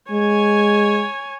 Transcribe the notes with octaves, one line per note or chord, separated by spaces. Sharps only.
G#3 C#5 G#5